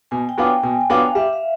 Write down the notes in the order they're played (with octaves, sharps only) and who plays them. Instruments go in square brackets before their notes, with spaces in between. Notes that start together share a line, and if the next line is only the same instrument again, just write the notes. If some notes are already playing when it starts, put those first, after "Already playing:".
[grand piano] B2 [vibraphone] G#5
[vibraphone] G5
[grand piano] F#3 B3 D4 F4
[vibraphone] G5
[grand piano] B2 [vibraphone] G#5
[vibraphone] G5
[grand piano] F#3 B3 D4 F4
[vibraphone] F5
[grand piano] G3 [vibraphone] E5
[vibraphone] F5